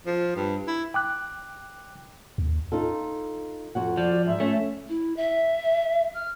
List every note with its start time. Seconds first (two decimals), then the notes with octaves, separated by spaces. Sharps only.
0.06 F3
0.36 G2
0.67 E4
0.94 G5 D6 F#6
2.38 D#2
2.72 D#4 F4 A4
3.75 F2 F#4 F#5
3.97 F3 D5
4.27 G#2 E5
4.40 A3 C#4
4.89 E4
5.17 E5
6.15 F6